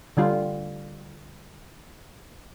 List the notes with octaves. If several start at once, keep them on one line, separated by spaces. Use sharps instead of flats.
D3 G3 F4